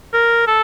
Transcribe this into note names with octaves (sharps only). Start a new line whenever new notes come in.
A#4
A4